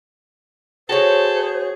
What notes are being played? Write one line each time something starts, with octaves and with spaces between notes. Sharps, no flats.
F#4 G#4 A4 C5 C#5